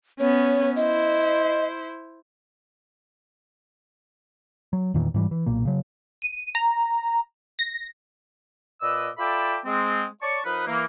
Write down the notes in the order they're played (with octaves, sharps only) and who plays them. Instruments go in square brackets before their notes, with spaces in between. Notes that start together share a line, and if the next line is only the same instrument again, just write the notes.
[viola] B3 C#4 [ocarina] C#5
[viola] E4 C5 [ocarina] D#5
[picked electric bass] F#3
E2 A#2 D#3 E3
G#2 E3 G3
E3
B1 A#2 A#3
C#3 F#3
[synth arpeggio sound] D#7
A#5
A#6
[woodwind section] A#2 B4 D5 D#5 E6
F4 A4 D5 E5 G5 B5
G#3 C4
C#5 D5 A5 C#6
F3 D#4 A#4 B4
E3 A#3